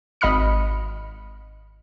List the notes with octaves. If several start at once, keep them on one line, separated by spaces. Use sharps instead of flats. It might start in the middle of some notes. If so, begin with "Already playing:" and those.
G#1 D#5 B5 F6 C#7